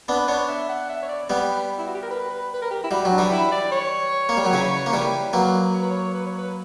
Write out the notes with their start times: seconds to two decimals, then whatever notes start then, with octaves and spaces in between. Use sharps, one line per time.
0.08 B3 D4 B4
0.28 B3 D4 C#5
0.48 E5
0.69 F#5
0.89 E5
1.02 C#5
1.09 D5
1.30 G3 B3 B4
1.79 E4
1.87 F#4
1.95 G4
2.02 A#4
2.10 B4
2.30 B4
2.54 B4
2.62 A#4
2.71 G4
2.84 E4
2.91 G3 F#4
3.05 F#3
3.11 D4
3.18 E3 G3
3.32 E4
3.52 D5
3.71 C#5
4.29 A#3
4.37 G3
4.45 F#3
4.53 C#3 E3
4.86 A#3
4.93 E3 G3
5.33 F#3 A#3 B4
5.74 C#5
5.82 B4
5.90 C#5
6.14 B4
6.26 C#5
6.38 B4